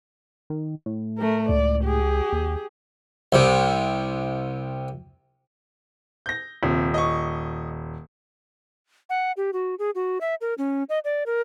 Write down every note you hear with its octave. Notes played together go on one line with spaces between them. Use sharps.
D#3
A2
A3 A#4
C#2 D5
G4 G#4
D#2
C2 C3
G6 A#6
D#1 C3
D#5 C#6
F#5
G4
F#4
G#4
F#4
E5
A#4
C#4
D#5
D5
A#4